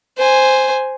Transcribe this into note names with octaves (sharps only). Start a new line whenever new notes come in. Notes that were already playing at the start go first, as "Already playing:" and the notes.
C5 G#5